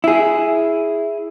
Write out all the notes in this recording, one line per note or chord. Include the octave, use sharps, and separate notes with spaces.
E4 G#4